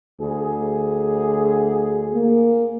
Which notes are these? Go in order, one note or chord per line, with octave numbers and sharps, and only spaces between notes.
D2 G#4
A#3